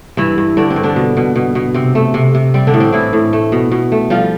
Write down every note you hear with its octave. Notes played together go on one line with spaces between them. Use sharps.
G2 E3 E4
G2
G2 D3 D4
C4
G2
D3 D4
B2
B2
B2
B2
C3 C4
A3
C3
C3
G3 C4
D3 D4
A2
C4
A2 E3 E4
A2
A3
B2
B2
A3
F3 G3 F4